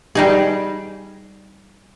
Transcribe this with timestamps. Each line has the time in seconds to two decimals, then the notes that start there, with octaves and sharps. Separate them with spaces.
0.15 G3 D#4 G#4